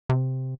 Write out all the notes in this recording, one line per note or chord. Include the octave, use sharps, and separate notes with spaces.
C3